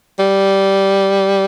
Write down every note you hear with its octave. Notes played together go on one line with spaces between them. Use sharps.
G3